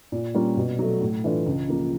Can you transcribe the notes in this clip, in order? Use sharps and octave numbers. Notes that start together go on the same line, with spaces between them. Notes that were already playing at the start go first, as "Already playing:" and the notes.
A#2
G3 A#3 C#4 F4
B2
F#3 A3
A2
E3 A3 D4 F4
C#2
C#3 F3 A#3